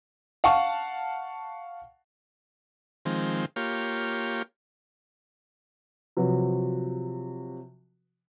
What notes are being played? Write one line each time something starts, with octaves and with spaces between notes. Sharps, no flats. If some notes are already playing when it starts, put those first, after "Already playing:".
F5 F#5 A5 C#6
D#3 F3 G#3 C4
A#3 F4 G4 C#5
C3 F3 F#3 F#4 B4